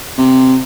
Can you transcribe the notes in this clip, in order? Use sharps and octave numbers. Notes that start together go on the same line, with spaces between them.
C3